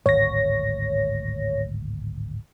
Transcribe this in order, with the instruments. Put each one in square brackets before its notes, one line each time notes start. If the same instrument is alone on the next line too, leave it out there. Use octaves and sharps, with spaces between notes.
[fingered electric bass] D1 G#1 [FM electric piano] C#5 A#6